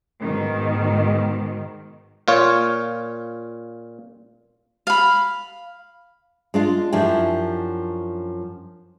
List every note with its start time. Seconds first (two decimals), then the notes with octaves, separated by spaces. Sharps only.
0.20 G#2 B2 D#3
2.28 A#2 F4 C#5
4.87 F5 B5
6.54 G#3 D4 F4
6.93 F#2 F3 D4 E4 G4